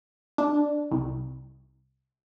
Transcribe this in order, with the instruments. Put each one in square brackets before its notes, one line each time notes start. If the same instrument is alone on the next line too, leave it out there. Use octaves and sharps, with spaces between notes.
[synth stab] D4
C2